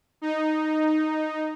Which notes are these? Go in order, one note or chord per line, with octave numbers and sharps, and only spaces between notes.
D#4